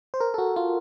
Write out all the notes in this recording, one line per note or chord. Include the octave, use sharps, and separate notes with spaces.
C5
A#4
A4
F#4
F4